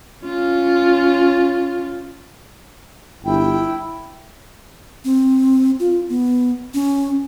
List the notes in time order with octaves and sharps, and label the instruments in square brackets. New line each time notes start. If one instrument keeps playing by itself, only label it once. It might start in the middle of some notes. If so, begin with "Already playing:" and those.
[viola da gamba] C#4 F4
[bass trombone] G1 [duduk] E4 [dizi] G5
[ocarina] C4
F4
B3
C#4